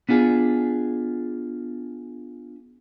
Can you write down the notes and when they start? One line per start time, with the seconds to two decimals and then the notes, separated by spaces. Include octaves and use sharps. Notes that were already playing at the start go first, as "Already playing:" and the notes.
0.09 B3 D4 F4 G#4